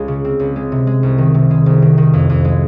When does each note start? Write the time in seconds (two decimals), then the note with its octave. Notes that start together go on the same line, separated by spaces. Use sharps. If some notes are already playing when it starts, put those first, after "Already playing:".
Already playing: C#2 G#3
0.08 C#3
0.25 C4
0.40 C#2
0.56 G#3
0.72 C3
0.87 G#3
1.03 C2
1.18 D#3
1.34 C3
1.51 G#3
1.66 C2
1.82 D#3
1.98 D#3
2.13 F2
2.30 F2
2.45 G#3